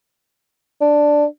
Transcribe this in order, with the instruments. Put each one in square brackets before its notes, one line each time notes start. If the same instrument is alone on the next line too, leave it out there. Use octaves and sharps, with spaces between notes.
[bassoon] D4